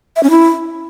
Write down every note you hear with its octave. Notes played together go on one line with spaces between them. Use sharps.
E5
C#4
E4